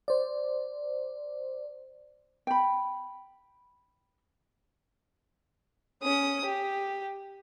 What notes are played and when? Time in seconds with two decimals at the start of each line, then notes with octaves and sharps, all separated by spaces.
0.08 C5 D5
2.47 G5 B5
6.03 C#4 D#6
6.45 G4